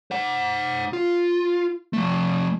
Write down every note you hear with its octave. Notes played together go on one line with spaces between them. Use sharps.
C5 F#5
F4
F3 A3